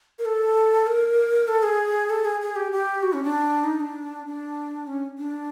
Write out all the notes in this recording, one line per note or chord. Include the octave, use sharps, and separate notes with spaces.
A#4
A4
A#4
A4
G#4
A4
G#4
G#4
G4
G4
F#4
C#4
D4
D#4
D4
D4
C#4
D4